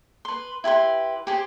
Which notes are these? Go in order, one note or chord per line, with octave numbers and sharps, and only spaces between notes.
B4 C6
E4 G4 B4 C6
G4 G#4 C5